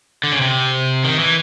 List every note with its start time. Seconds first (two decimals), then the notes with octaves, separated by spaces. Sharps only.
0.24 D3
0.32 C#3
0.41 C3
1.04 D#3
1.19 E3